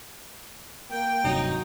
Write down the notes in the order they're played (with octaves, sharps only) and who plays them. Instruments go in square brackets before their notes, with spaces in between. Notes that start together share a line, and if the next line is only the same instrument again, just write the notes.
[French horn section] A#3 [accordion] G5
[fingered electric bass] D#1 G2 C3 [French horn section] F#3 [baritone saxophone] D#4